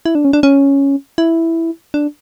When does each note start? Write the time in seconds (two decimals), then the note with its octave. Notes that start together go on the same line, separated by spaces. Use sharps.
0.06 E4
0.15 D4
0.25 C#4
0.33 D4
0.43 C#4
1.18 E4
1.94 D4